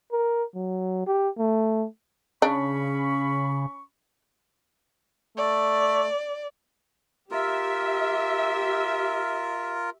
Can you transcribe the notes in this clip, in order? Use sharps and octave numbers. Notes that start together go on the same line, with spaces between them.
A#4
F#3
G4
A3
C#3 C#4 D4 B5 C#6
A3 D5
F4 G4 A#4 E5